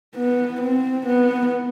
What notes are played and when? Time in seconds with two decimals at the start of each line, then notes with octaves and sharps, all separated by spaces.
0.16 B3
0.61 C4
1.07 B3